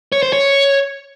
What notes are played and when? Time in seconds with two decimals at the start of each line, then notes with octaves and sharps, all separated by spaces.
0.12 C#5
0.23 C5
0.33 C#5